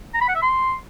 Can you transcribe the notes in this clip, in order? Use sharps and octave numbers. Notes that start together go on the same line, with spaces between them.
A#5
B5
F#5
E5
C6